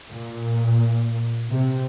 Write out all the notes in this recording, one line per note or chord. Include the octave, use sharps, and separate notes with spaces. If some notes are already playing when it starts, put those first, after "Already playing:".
A#2
C3